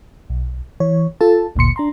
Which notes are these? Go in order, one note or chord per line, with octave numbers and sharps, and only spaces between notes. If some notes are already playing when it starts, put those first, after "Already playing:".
B1
E3 C#5
F4 A4 A5
G1 D2 A#2 C6 C#7
D4 A#5 C6